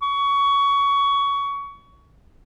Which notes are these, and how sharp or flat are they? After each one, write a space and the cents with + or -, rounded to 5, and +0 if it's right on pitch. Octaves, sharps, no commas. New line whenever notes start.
C#6 +20